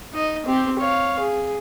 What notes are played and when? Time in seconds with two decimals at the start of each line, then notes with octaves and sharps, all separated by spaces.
0.13 D#4 D#5
0.46 C4 G4
0.79 C#5 F5
1.19 G#4